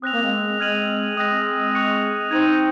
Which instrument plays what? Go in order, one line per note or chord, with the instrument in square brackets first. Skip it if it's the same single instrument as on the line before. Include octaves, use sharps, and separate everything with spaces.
[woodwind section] C4 [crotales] D#6 F#6 A#6 F7
[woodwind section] A#3
G#3 C4
[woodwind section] G#3 C4 [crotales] F6 G#6 D#7 F#7
[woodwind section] G#3 C4 [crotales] D#6 F#6 A#6
[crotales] C#6 F#6 C#7 F7
[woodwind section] C4 D#4 [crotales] G#6 D#7 F#7